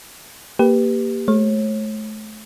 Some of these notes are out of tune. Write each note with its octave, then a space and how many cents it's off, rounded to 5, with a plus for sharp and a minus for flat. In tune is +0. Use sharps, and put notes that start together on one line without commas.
A#3 +0 G4 +10 B4 +0
A3 -35 C#5 -35